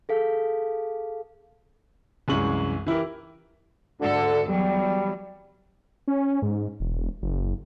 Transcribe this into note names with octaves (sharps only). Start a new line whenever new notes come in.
G#4 A4 F5
C2 F#2 E3 G#3 C#6 F#7
E3 E4 G4 A#4
D2 G#2 D3 A4
E2 F#3 G3
C#4
G#2
E1
F#1